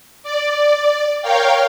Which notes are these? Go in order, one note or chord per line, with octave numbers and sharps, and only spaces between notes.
D5
A#4 C#5 F5 G5